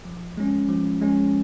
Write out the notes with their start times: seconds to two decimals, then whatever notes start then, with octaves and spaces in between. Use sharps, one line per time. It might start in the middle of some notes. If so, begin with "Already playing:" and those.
0.05 F3
0.37 G#3 C#4
0.69 F3
1.02 G#3 C#4